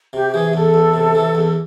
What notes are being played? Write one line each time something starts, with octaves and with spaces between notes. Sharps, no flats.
C3 G4
G4
E3 G#4
E2 A4
E2
C3
E3
E2